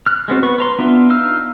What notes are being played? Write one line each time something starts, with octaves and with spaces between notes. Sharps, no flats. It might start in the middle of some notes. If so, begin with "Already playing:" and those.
F6 F#6
G#3 B3 C4 F#4
B3 B4 C#6
B4 A#5 C6
B3 D4 F4 E5
D#4 F5 E6 F6